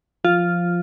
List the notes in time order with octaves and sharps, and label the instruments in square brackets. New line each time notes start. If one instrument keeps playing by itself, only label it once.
[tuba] F3 [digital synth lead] F4